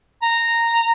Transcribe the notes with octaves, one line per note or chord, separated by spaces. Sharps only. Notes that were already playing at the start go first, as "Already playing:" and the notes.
A#5